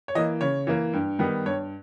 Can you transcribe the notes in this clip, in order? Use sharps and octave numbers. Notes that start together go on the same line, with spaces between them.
C#5
E3 A#3 D#5
C#3 C#5
E3 A#3
G2
D#3 G3 B3
G2 C#5